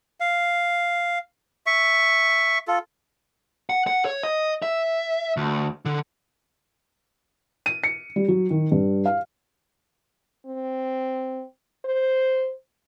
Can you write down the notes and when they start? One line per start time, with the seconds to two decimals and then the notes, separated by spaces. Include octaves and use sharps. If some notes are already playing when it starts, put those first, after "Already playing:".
0.20 F5
1.66 E5 C#6
2.68 F4 A4
3.70 F#5
3.87 F#5
4.05 C#5
4.23 D#5
4.62 E5
5.37 D2
5.85 D3
7.66 D#7
7.84 C#7
8.16 G3
8.28 F#3
8.50 D#3
8.72 G2
9.06 F5
10.46 C4
11.85 C5